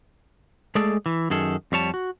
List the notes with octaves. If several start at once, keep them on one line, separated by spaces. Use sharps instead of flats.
G#3 A3 G#4 A4 D5
E3
F#2 D#3 G#4 A4
F2 G3 C#5 A5
F#4